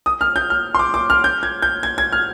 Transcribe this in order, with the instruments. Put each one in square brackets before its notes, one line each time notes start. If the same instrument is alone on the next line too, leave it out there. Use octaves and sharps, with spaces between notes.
[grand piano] D#6
F6
G6
F6
C6
D6
D6
F6
G6
G#6
G6
G#6
G#6
F6